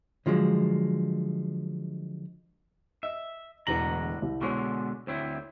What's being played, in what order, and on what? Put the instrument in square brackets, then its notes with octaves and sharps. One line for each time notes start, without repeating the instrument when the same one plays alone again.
[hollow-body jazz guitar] D3 F3 F#3 G#3
[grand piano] D#5 [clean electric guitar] E5
[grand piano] E1 E2 F#7 [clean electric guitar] A2 D3 A#5
[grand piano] C2
[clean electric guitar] B2 D3 G#3 [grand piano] C#5 C#6
[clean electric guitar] D2 C4 E4 [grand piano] C#5